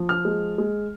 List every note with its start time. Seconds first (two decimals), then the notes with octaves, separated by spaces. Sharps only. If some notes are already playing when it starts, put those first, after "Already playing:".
Already playing: F3
0.09 F6
0.25 G#3
0.58 G#3